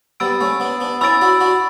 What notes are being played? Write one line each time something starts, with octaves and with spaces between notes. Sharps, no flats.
G3 B3 B5 E6 A6 D7
A3 C#4
B3 D4
B3 D4
C#4 E4 B5 E6 A6 D7
D4 F#4
D4 F#4